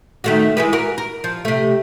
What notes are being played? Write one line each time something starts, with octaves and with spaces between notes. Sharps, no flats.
D#3 A3 F#4
E3 G#3 B4
F#4 A#4
A#4
F3
C3 A3